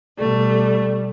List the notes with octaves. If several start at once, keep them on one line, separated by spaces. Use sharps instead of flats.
B2 G3 A3 D5